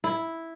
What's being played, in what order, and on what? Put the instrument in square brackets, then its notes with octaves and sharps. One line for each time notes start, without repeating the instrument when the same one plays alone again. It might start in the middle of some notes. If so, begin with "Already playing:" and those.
[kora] E4